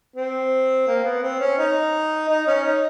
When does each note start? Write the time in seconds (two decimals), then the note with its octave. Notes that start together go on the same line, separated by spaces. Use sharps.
0.16 C4
0.88 A#3
1.04 B3
1.22 C4
1.40 C#4
1.58 D#4
2.29 D#4
2.47 C#4
2.64 D#4